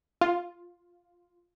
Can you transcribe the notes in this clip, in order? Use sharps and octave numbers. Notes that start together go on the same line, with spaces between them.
F4